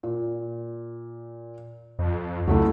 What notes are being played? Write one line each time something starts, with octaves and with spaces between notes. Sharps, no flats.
A#2
F2
C#2 F#3 A3 E4